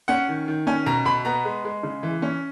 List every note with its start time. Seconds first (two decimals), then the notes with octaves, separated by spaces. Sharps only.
0.08 C#4 F#5
0.28 D#3
0.48 D#3
0.67 C#4 G#5
0.86 B2 A#5
1.05 B2 B5
1.25 B3 A#5
1.45 G#3
1.65 G#3
1.83 C#3
2.03 E3
2.22 C#4